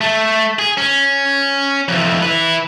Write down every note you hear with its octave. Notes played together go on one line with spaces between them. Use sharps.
A3
G#4
C#4
F2 E3
E4 B4